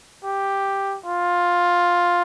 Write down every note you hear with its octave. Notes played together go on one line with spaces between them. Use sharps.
G4
F4